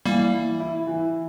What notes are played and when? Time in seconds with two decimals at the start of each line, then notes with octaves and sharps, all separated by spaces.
0.06 E3 G3 A#3
0.33 E4
0.60 E4
0.87 E3